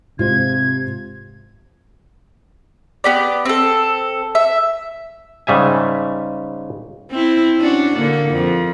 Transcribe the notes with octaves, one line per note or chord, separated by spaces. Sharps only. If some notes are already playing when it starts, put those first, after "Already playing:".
G#2 C3 G#3 F4 C5 G#6
B3 G4 D5
C4 A4
E5
G#2 C#3 G3 E5 G#5
C4 E4
C#4 D4 F#4
D3 A#3
F2